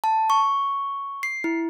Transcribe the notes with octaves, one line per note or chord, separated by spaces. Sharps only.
A5
C#6
C7
E4